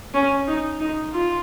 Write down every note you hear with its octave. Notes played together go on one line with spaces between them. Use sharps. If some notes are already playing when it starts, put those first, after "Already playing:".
C#4
D#4
D#4
F4